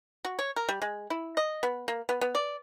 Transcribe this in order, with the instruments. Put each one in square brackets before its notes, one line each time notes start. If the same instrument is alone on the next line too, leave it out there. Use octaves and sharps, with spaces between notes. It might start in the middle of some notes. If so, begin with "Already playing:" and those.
[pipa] F#4
C#5
A#4
G3
G#3
E4
D#5
B3
A#3
B3
B3
D5